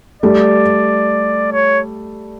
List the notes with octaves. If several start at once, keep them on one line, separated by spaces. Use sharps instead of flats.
G3 A3 D5
C#5